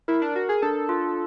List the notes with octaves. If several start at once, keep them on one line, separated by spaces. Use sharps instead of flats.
E4 A#4
D4
F#4 A#4
G#4
D4 A4
F4